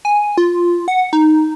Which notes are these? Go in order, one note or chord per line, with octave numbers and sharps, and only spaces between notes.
G#5
F4
F#5
D#4